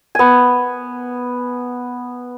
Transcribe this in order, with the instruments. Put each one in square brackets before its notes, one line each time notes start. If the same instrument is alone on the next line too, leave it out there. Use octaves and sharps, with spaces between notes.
[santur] B3 G#5